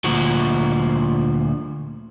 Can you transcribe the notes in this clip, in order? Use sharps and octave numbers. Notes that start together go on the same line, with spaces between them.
D2 A#2 F3 F#4